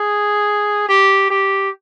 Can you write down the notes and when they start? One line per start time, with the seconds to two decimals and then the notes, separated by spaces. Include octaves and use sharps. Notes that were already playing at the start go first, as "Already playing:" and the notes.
Already playing: G#4
0.89 G4
1.30 G4